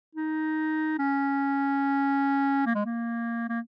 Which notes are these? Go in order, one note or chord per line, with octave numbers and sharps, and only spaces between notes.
D#4
C#4
A#3
G#3
A#3
A#3